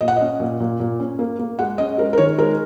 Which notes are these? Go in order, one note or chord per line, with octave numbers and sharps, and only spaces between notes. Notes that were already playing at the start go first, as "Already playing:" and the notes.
A#2 D#5
F#5
C#4 D#5
A#2
A#2
A#2
C#4
A#3
A#3
G#3 F#5
C#4 D#5
G#3 A#4
A#4
D#3 C#5
G#3 A#4